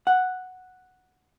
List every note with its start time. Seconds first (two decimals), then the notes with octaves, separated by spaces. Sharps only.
0.07 F#5